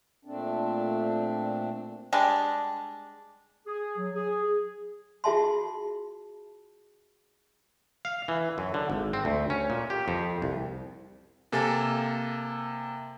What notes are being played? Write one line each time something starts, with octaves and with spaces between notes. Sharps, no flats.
A#2 A3 C4 D4
G3 G#3 D4
G#4
F#3
G#4
F4 F#4 G#4 E5 A5 C6
F5
E3
F#2
D3
G#1
C4
D2
C#4
A#2
G4
F2
C2
C3 A#3 A4 G#5 A6